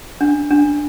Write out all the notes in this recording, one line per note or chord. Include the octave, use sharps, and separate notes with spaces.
D4
D4